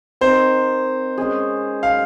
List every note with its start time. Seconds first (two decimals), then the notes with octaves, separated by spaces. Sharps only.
0.21 C4 D#4 A#4 C5
1.18 G#3 C#4 G#4
1.83 F5